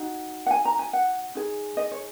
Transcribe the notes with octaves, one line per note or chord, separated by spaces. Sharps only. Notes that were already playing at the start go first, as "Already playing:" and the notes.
Already playing: D#4 F#4
F#5
G#5
A#5
G#5
F#5
D#4 G#4
D#5
C#5